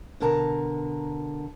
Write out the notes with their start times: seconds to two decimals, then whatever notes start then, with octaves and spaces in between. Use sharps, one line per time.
0.20 B2 D3 A#4 A5 A#5